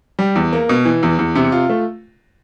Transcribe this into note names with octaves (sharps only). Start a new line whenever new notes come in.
G3
E2
A#3
B2
E3
E2
E2
C3
F4
A3